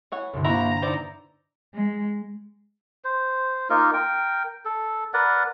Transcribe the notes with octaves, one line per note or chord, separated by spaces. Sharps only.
E3 C#5 F#5
C2 G2 D3
A#3 E4 F#4 C5 G5 A#5
D#4 E4 B4 C5 D5
G#3
C5
A#3 D#4 F4 A#4
A#4 G5
A4
A#4 B4 D5 F#5